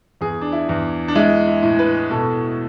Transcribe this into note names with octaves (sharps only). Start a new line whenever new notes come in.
E2 G#4
D4
E4
E2
D4
G#3 E4
E4
A2
B4
B2 A4